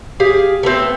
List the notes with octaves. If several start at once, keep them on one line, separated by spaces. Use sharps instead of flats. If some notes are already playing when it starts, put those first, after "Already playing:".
G4 G#4 F5
A3 B3 C4